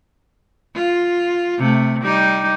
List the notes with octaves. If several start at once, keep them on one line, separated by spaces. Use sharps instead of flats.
F4
C3 A3
G3 D#4 G4